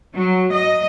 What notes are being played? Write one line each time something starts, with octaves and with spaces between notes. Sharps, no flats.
F#3
D#5